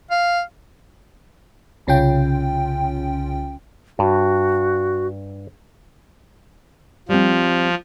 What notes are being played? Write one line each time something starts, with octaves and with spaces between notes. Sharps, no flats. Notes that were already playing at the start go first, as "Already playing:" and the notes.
F5
C2 C#3 C#4 F4 G5
G2 F#4
F3 G3 C4